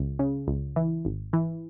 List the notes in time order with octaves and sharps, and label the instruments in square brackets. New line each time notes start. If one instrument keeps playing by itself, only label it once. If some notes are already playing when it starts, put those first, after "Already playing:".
Already playing: [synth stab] C#2
C#3
C#2
E3
G#1
E3